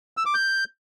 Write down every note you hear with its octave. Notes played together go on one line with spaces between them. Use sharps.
E6
D6
G6